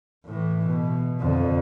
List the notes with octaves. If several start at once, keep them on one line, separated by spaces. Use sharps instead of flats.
A2 E3
B2
F2 D3